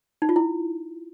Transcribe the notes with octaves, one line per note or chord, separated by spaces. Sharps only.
D#4
F4
E4